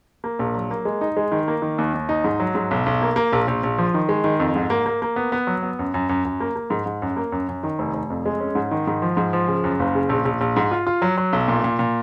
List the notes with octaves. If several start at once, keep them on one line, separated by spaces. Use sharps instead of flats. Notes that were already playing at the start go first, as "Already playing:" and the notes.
A#3
A#1
F#3
A#3
G#3
D#4
G#3
D#3
A#3
D#3
D#2
D#2
D#4
G#2
F#3
G#2
B1
B1
A#3
A#3
A#1
A#1
A#1
F3
D#3
G#3
D#3
F2
G#2
A#3
A#3
A#3
B3
B3
F#3
B3
F#2
F#2
F#2
F#2
A#3
A#3
G#2
G#2
F#2
A#3
F#2
F#2
D#3
F1
F1
F2
G#3
C#4
G#2
D#3
G#2
F3
G#2
F3
C#3
F#2
F#1
C#3
A#1
A#1
A#1
G#2
F4
F4
F#3
F#3
B1
A#2
A#2
A#2